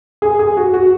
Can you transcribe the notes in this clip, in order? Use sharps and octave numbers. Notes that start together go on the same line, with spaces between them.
G#4
G#4
F#4
F#4